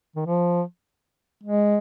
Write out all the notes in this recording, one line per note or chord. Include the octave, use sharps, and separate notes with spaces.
D#3
F3
G#3